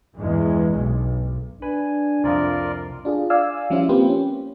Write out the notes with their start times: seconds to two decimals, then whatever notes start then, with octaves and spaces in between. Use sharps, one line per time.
0.17 E2 G2 G#3
0.73 B1
1.62 D4 B4 G#5
2.24 C2 F2 F4 A#4 D5
3.05 D4 F4 G#4
3.30 D5 F5 G#5 E6
3.70 F3 G3 C#4 E4 F4
3.89 A#3 C4 F4 G4 B4 C5
4.09 C#4